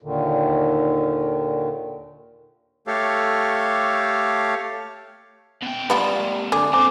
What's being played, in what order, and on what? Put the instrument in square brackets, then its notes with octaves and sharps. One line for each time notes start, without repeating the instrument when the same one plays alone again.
[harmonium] D#2 A#2 D3 D#3
[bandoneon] A3 G4 A4 C#5 F5
[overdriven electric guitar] B2 G5
[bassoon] G3 [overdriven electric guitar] G#3 A#3 [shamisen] B3 E4 F4
[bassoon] D3 [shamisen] G#4 [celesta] D6
[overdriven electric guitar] C4 D4 [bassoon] C5 [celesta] G#5 A#5 D6